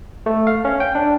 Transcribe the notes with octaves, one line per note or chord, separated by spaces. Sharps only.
A3
F5
C#4
G5
D4